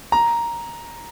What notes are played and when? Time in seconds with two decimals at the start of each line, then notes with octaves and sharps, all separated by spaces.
0.12 A#5